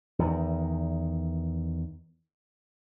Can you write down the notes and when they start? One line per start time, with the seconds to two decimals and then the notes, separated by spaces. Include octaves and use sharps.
0.19 E2 D#3